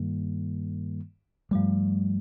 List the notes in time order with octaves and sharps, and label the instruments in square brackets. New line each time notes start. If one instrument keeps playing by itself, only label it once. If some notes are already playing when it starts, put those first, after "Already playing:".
Already playing: [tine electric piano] G2 D#3 G3 A#3
[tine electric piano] G2 F3 A3 [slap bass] G3